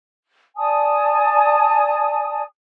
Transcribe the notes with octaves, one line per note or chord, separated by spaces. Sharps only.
D5 G#5 A5 D#6